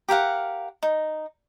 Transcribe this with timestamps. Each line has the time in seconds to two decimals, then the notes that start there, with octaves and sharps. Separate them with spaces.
0.09 G4 A#4 F5 F#5
0.83 D#4